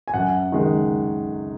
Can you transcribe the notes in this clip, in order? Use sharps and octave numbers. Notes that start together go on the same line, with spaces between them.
G#5
F#2 F#5
D#3 G#3